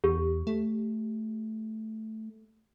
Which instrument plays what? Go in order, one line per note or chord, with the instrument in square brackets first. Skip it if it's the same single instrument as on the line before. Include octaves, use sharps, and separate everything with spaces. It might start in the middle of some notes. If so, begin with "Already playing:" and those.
[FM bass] E2 [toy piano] G4
[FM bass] A3